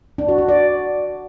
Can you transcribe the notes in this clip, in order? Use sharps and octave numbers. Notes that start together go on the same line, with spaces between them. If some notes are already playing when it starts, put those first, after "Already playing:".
D4
F#4
F#4
D5